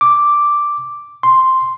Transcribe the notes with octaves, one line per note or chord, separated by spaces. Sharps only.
D6
C6